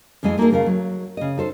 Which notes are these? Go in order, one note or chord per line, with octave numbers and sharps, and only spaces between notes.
F2 E3 G#3 D#5 G#5
A3 A#3 D#4 G4 G#4 A#4
D#2 C#3 A3 A#4 F5
F#3
C#3 D#5
D#4 A4 C5